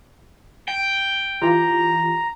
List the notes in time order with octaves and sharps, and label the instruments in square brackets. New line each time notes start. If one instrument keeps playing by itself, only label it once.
[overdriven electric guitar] G5
[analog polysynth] E3 F4 G4 [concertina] A#5